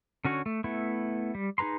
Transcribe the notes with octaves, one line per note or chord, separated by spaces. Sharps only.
D3 C#4 F#4 C#5
A3
A3 B3 E4
G3
D#4 G#4 B4 A#5 C6